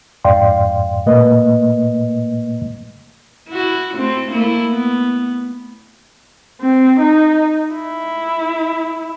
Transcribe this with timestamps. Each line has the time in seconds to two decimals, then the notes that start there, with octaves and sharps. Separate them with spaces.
0.24 F2 G#2 D5 F5 G5 C6
1.06 A#2 A3 A#3 B4 D#5
3.49 E4 F#4
3.97 A3 C4
4.31 A3 A#3 E4
4.70 B3
6.61 C4
7.00 D#4
7.74 E4